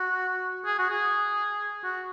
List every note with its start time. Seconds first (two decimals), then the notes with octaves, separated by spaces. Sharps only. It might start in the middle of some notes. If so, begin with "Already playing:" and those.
Already playing: F#4
0.65 G#4
0.79 F#4
0.90 G#4
1.84 F#4